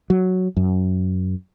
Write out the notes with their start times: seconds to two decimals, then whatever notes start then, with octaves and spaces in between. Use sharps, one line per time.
0.10 F#3
0.57 F#2